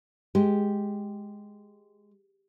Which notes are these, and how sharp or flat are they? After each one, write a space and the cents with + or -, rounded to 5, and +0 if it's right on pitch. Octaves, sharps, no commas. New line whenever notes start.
G#3 +0 G4 +0